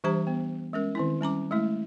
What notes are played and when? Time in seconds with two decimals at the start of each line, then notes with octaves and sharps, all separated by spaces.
0.04 E3 G3 D4 G4 C5 A#5
0.27 B3
0.73 G#3 C#4 A#4
0.95 D#3 C4 E4
1.21 G3 C#4 A#5 D6
1.51 G#3 A3 E4